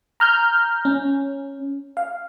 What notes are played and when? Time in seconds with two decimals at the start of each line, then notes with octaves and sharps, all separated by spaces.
0.20 A#5 F6 G6
0.85 C#4
1.97 F5